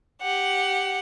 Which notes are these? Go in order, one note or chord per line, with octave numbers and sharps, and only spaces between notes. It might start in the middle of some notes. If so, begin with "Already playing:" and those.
G4 F#5